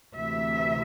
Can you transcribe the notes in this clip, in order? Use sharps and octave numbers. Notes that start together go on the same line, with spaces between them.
D2 C3 E3 E5